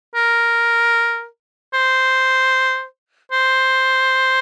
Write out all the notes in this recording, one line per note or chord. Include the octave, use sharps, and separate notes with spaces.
A#4
C5
C5